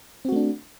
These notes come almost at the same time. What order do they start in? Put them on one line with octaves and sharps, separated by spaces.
C4 F#4 A3 D4